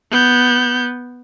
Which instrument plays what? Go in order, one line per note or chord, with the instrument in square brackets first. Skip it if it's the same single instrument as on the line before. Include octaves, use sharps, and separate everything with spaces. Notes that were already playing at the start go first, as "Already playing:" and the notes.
[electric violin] B3 G6